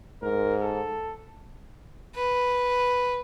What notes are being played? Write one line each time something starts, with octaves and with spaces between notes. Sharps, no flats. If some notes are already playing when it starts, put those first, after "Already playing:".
G#2 A#4
A4
B4